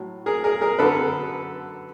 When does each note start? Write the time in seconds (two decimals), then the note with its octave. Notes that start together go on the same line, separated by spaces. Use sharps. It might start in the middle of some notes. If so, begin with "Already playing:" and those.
Already playing: A2 F#3
0.26 G#4 A#4
0.44 G#4 A#4
0.61 G#4 A#4
0.79 F#2 D3 F#3 A4 B4